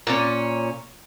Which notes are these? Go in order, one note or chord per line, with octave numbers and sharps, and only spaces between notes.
A#2 C#4